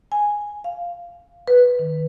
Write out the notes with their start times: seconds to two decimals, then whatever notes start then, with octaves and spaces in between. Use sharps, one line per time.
0.12 G#5
0.64 F5
1.48 B4
1.79 D#3